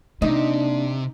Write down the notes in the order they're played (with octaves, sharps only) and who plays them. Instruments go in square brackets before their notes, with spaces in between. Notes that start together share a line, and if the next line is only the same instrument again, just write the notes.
[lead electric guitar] C3 [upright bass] A#3 [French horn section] D4 [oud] D#4